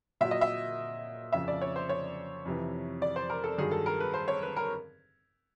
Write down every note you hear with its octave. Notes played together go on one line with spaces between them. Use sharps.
A#2 F#3 E5
D#5
E5
F2 C#3 F3 E5
D5
C#5
C5
C#5
F2 C3 E3
D5
C5
A#4
A4
G2 D#3 F#3 G#4
A4
A#4
B4
C5
C#5
B4
A#4